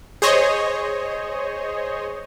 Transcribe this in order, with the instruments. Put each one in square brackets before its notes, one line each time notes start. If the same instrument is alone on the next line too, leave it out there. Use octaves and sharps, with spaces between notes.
[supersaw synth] G#4 C5 C#5 D#5